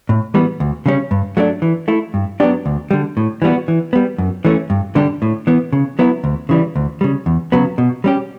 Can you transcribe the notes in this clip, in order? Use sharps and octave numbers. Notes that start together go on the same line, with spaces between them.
A2
E3 G3 B3
D2
C#3 G3 C#4
G2
F#3 A3 D4
E3
A3 E4
G2
F#3 B3 D4 G4
D2
D3 G3
A2
E3 G3 B3 F#4
E3
G3 B3
F#2
E3 A3 C#4
G2
D3 G3 D4 G4
A2
E3 B3
C#3
F#3 B3 E4
D2
C#3 E3 G3
D2
C#3 G3
E2
C#3 F#3 B3
B2
G3 C#4 G4